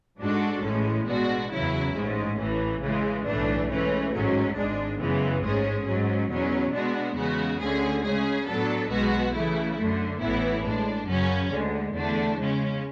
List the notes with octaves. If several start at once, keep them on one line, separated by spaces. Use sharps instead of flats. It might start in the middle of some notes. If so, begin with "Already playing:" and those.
G#2 G#3 D4 F#4 A4
A1 A2 G#3 C#4
B2 G#3 D4 F#4
E2 C#3 F#3 C#4 E4
A1 G#2 G#3 C#4
A1 A2 E3
C#3 E3 G#3
B1 A2 E3 A3 D4
G#2 E3 A3 C#4
A1 G#2 F#3 C#4
G#1 G#2 G#3 D4
F#2 C#3 E3 G#3 B3
A1 G#2 G#3 C#4 G#4
G#2 F#3 C#4
E2 B2 F#3 C#4
B2 G#3 B3 D4 F#4
E2 C#3 G#3 B3 F#4
D2 D3 A3 C#4 G#4
C#3 G#3 C#4 G#4
A2 F#3 B3 D4 A4
B1 B2 G#3 B3 F#4
C#3 E3 A3 E4
F#2 D3 A3
A1 A2 E3 B3 E4
A2 G#3 D4
F#2 C#3 F#3 C#4
D2 D3 G#3
E2 D3 A3 D4
C#3 G#3 C#4